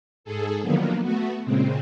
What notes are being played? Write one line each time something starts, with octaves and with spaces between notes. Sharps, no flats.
G#2 G#4 A4
D3 D#3 F3 F#3 A#3 B3
A3 B3 F#4
A#2 C#3 G#3 C4